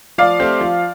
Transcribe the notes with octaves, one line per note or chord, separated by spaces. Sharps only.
F3 D5 F5
A3 C4 G4
F3